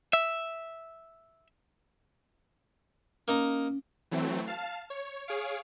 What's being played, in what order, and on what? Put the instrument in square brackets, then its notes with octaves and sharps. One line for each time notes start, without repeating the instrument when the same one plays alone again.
[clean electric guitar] E5
[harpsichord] A#3 D#4 A#5 [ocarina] C#4
[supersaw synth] E3 F#3 A3 C4
F5 A5
C#5
G#4 C#5 F5 D7